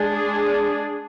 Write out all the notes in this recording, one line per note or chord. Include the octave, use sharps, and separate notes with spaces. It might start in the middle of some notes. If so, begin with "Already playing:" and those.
Already playing: G#3 D4 G#4